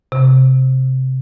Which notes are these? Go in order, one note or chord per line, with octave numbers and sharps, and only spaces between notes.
C3